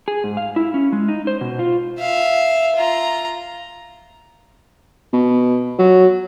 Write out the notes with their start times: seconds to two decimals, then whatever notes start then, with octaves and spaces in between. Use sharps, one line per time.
0.08 G#4
0.24 G#2
0.37 F5
0.56 E4
0.74 C#4
0.92 G#3
1.08 D#4
1.27 C5
1.41 B2
1.59 F4
2.00 E5 F5
2.76 F4 A#5
5.13 B2
5.79 F#3